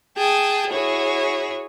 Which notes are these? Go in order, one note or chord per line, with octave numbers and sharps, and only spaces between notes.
G#4 G5 A5
E4 F#4 G#4 C#5